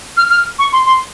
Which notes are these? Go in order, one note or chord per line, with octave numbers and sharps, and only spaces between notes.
F6
F6
C#6
C6
C6